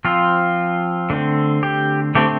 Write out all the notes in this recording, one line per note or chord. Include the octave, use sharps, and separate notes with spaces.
F3 C4 F4
D3 A3 C4
G4
D3 A3 C4 G4